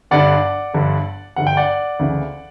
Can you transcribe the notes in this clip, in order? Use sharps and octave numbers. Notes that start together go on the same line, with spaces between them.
G1 G2 D3 D5 F#5
G1 G2 D3
G1 G2 D3 F#5
G5
D5 F#5
D2 C#3 E3